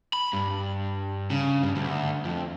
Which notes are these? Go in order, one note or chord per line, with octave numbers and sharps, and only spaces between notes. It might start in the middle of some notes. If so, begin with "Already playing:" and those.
B5
G2
C#3
G2
D2
F2